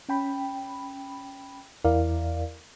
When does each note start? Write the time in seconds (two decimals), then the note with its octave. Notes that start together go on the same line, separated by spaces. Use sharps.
0.09 C#4 G5 B5
1.84 E2 E4 A#4 D5 F5